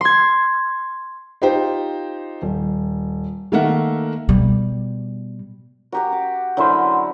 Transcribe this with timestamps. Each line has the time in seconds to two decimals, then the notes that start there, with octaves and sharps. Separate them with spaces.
0.01 C6 G#6
1.42 D#4 F4 G4 C5 G5
2.42 D#1
3.52 D#3 A3 A#3 E5 F#5
4.29 B2 G3
5.92 F#4 G4 A#4 F#5
6.12 D6
6.57 D3 F#3 E4 A#4 C5